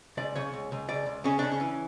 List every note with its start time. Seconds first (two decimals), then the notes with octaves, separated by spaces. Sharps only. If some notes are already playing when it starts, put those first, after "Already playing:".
0.17 C#2 D5
0.35 C#3 C#5
0.54 C#2
0.72 C#2
0.89 C#2 D5
1.06 C#2
1.24 C#3 C#4
1.39 C#3 D4
1.52 C#4
1.60 E3